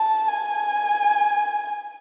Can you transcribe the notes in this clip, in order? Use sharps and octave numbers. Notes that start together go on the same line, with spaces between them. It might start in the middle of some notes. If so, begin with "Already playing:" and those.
Already playing: A5
G#5